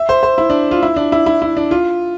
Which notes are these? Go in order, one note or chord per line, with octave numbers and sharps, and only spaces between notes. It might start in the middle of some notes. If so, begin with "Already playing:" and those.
Already playing: E5
C5
C5
E4
D4
F4
E4
D4
E4
E4
E4
D4
F4